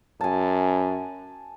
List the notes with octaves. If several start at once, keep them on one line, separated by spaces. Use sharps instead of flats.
F#2 G#5 A5